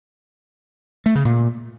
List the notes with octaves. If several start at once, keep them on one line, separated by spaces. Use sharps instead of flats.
A3
C#3
A#2